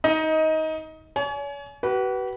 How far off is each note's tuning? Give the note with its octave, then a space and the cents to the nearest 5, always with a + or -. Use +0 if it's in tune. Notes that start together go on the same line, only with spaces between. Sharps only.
D#4 +20 D#5 +15
C#5 +40 G#5 +30
F#4 +45 B4 -15